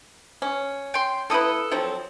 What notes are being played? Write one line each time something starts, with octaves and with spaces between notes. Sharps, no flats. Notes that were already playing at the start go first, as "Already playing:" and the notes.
C#4
G5 C6
A#3 E4 A4 B4 D#6
F3 F#3 C4